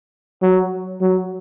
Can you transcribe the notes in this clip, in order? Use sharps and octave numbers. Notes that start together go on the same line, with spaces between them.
F#3
F#3